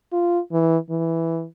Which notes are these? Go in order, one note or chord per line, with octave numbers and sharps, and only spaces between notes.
F4
E3
E3